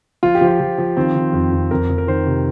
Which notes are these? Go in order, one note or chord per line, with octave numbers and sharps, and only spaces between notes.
F3 F4
G4
F3
F4
F3
F3
D#3 C4
D#3
F2
F2
F2 A#4
F2
A#4
D#3 C5
C3